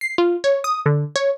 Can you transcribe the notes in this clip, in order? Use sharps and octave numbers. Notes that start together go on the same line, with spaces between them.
C7
F4
C#5
D#6
D3
C#5